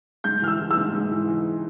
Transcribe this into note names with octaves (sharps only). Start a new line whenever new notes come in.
G#2 G6
E3 F6
E6
E3
E6
G#2
G#2
E3
E3